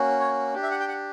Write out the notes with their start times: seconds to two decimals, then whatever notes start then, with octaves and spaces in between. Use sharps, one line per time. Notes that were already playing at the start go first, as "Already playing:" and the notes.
Already playing: A#3 C#4 F#4
0.20 C#5
0.54 D4 G4
0.63 E5
0.71 F#5
0.80 G5
0.88 F#5